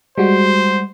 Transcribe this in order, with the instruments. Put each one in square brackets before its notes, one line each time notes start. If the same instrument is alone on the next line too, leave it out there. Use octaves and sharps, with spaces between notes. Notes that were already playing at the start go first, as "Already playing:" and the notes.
[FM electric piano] G3 G#3 F#4 [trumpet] C5